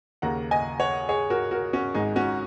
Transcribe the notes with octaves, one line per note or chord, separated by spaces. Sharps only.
D#2 C#3 A#3 F#5 A#5
D#5 G#5
C#5 F#5
G#4 C#5
F#4 A#4
F#4 A#4
C#4 F#4
G#1 G#2 G#3 D#4 G#4
C#4 F#4